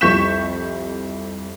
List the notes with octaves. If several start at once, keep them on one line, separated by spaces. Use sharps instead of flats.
C2 F2 C#6 G6 B6 E7